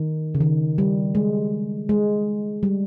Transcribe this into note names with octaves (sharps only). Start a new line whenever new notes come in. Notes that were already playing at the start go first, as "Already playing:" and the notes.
Already playing: D#3
C#3
D#3
G3
G#3
G#3
G3